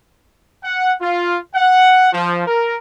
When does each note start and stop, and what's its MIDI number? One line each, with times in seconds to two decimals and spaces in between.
0.64 0.92 78
1.01 1.37 65
1.55 2.11 78
2.12 2.44 53
2.46 2.76 70